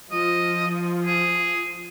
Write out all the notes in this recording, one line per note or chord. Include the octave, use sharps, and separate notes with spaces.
F3 D#5
G#4